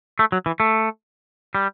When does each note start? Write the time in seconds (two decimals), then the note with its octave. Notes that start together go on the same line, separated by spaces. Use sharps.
0.19 A3
0.32 F#3
0.46 E3
0.60 A3
1.55 G3